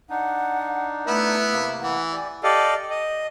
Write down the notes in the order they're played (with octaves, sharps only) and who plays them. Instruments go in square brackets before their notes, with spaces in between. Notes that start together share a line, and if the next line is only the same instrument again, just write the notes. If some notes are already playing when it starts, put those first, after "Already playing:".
[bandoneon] D4 D#4 [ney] F#5
[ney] A3 [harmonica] B3 E4
[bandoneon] C3 A#3
[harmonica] E3 [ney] F#5
[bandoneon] G4 D5 [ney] G#5
[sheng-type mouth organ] G4 A4 D5 D#5 F5
D#5